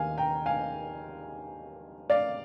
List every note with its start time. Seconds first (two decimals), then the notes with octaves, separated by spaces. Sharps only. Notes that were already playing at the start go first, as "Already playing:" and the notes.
Already playing: D#2 D#3 G#3 F5 G#5
0.18 G5 A#5
0.46 F5 G#5
2.10 D5 F5